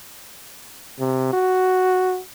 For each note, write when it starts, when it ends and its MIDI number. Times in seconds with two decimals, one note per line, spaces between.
0.99 1.29 48
1.33 2.19 66